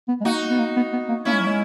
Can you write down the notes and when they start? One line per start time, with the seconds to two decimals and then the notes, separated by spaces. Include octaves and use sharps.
0.08 B3
0.21 G#3
0.25 A#3 D#4 F#4
0.50 B3
0.59 A#3
0.76 B3
0.93 B3
1.09 A#3
1.25 A#3 C#4 E4
1.33 G#3
1.40 F#3
1.47 G#3